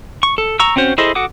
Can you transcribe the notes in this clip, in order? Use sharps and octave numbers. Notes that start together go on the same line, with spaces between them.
C#6
A4
A#5 C#6 E6
C4 C#4 F#4 C5
E4 G#4 A4 C5 D#5
F#4 A4 F#5 D6 D#6